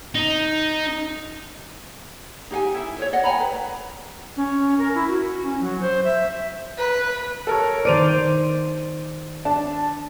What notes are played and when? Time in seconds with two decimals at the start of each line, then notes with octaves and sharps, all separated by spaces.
0.15 D#4
2.51 D#4 G4 F5 G#5
2.74 E4 E5
2.99 C5 C#5
3.12 D5 D#5 F#5
3.23 G5 G#5 A#5 B5
3.40 B4
4.37 C#4
4.79 A#4
4.94 E4
5.08 F#4
5.44 C#4
5.60 F#3
5.81 C5
6.05 E5
6.76 B4
7.47 A4 A#4 C#5
7.85 D#3 C5 D5 D7 D#7 F7
9.45 D4 A5